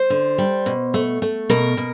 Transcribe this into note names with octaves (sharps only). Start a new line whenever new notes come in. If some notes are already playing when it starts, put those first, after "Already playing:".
Already playing: C5
D3
G3
B2
A3
A3
B2 A#4
B2